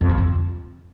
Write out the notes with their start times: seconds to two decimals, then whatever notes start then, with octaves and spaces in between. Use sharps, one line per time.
0.01 F2
0.09 D3
0.18 F2